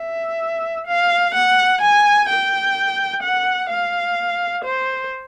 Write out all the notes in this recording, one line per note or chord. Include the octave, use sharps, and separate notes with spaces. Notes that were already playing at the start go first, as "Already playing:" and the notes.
Already playing: E5
F5
F#5
G#5
G5
F#5
F5
C5